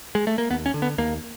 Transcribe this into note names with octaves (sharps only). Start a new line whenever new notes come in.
G#3
A3
A#3
D#2 B3
C#4
D3
B3
D#2 A#3